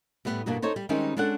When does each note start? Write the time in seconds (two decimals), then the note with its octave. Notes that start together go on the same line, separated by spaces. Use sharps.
0.25 A2 G3 B3
0.46 G2 B2 A#3 B3 D4
0.62 D#4 A4 C5 C#5
0.76 G3
0.89 D#3 G3 G#3 C4 C#4 D#4
1.17 G#3 C#4 D4 A4 F#5